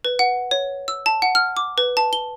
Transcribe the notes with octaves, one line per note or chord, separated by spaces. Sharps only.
B4
F#5
C#5
E6
A5
F#5
F6
D6
B4
A5
G7